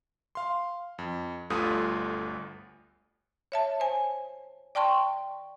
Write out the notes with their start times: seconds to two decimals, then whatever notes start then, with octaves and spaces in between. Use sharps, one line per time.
0.35 F5 C6
0.98 F2
1.50 G1 D2 G2 F4 A4 D#6
3.52 C#5 E5 A5
3.80 C5 G#5
4.75 D5 G5 A5 C6 C#6